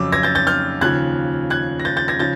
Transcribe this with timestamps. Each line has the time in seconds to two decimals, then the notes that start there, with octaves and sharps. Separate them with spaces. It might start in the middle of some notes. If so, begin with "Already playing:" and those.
Already playing: F2 C#3 F#3 D6 E6
0.12 G#6 A#6
0.23 G6 A6
0.35 G6 A6
0.47 F6 G6
0.81 D#2 C#3 F3 F#6 G#6
1.50 F#6 G#6
1.80 A#6
1.85 G6 A6
1.97 G6 A6
2.08 G#6 A#6
2.19 C#3 F3 G6 A6